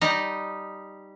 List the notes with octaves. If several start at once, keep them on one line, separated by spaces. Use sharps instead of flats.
G3 D#4